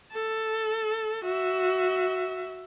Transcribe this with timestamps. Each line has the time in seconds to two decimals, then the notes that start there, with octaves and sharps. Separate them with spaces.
0.12 A4
1.24 F#4 E5